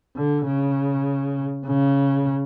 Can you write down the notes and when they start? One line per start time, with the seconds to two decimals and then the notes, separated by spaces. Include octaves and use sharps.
0.16 D3
0.46 C#3
1.66 C#3